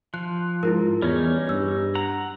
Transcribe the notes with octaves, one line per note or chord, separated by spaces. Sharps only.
F3 F#6
G#2 E4 F4 A#4
E2 G3 C#4 D#4 C#5
G2 E6
F#5 A#5